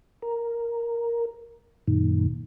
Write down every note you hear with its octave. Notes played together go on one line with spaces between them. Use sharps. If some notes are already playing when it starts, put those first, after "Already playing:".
A#4
F#2 A#2 D#3